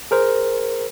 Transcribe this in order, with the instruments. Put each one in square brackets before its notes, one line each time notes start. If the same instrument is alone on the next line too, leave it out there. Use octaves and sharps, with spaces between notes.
[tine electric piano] G#4 A#4 C5